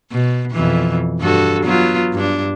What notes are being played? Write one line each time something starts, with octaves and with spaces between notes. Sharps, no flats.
B2
F2 B2 E3
G2 F#4 A4
F#3 B3 F4
G2 D4